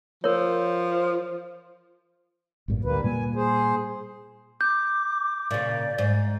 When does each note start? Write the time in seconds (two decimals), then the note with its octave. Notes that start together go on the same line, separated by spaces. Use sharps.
0.24 F3 A#4 C#5
2.68 A1 G2 A#2
2.85 D2 G3 A#3 B4
3.04 A#2 G3 A#3 G#5
3.35 G#4 C5
4.61 D6 G6
5.51 A#2 C#3 D5
5.98 G#2